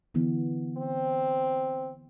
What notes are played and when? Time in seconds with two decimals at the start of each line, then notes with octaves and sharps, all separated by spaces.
0.14 D3 E3 B3
0.77 C4